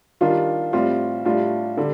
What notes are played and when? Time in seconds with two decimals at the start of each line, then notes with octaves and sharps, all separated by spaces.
0.21 D#3 G3 D4 F4
0.73 A2 G3 C4 F4
1.25 A2 G3 D4 F4
1.77 D3 G3